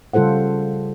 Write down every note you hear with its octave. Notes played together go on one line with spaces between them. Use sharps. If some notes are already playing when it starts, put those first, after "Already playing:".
C#3 G3 F4 A4 C5 F#5